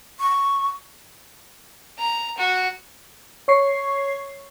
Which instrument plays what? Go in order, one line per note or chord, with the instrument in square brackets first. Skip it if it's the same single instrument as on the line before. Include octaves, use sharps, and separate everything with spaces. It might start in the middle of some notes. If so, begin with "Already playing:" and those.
[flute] C#6
[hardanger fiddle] A#5
F#4
[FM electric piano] C#5 C#6 C7